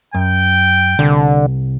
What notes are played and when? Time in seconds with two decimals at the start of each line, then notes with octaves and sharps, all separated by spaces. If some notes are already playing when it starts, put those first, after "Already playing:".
0.14 F#2 G5
0.99 C2 D3